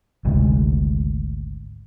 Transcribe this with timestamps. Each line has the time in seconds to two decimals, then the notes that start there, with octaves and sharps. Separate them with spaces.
0.25 G#1 D2 C3 G#3